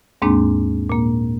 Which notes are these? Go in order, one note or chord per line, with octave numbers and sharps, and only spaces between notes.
D#2 G#2 G#3 A#3 C4 D4
A#2 A#3